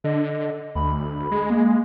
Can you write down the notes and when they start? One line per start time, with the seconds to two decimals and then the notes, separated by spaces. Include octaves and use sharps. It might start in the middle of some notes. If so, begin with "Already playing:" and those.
0.04 D3 D#5
0.75 D2 B5
1.19 D2
1.31 G#3
1.50 A#3